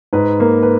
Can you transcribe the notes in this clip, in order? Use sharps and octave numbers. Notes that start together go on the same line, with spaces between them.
G#2 B4
A#3
B4